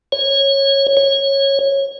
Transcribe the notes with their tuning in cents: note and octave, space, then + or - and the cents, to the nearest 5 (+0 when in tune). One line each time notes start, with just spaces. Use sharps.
C#5 -15
C#5 -15